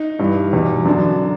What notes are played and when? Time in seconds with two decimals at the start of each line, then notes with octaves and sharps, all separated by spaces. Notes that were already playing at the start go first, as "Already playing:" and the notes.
Already playing: D#4
0.19 G2 E3
0.53 E2 B2
0.86 F#2 D3 D4